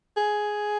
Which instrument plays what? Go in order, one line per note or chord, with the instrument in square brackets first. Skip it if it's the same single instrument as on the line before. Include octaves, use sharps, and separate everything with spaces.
[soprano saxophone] G#4